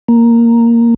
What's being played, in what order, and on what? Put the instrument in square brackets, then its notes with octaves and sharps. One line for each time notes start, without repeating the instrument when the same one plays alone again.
[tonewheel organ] A#3